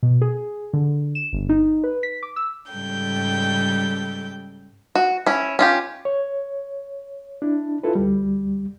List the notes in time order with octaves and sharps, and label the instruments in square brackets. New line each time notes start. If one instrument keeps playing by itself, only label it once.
[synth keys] B2
G#4
D3
E7
G1
D#4
B4
B6
D6
E6
[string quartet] G#2 C#3 G3 A4 G5 G6
[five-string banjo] F#4
C#4 E4
C#4 F4 G4
[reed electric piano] C#5
D4 E4
E4 F4 A4 B4
D2 G3